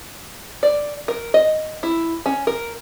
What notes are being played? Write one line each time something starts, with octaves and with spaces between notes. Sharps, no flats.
D5
A#4
D#5
E4
C#4
A#4